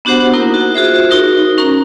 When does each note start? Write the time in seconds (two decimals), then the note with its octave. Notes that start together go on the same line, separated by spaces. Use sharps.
0.05 B3 D4 F#4 G4 C5 F#5
0.33 A#3 D#4 E4 A#4
0.54 F#4
0.74 F4 F#4 G#4 C5 E5
1.11 D#4 F#4 A#4
1.58 C#4 A#4 A#5